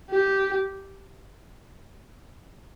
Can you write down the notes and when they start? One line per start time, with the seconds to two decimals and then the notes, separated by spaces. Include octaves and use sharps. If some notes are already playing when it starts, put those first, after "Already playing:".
0.10 G4